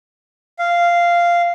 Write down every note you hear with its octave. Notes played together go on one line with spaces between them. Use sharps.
F5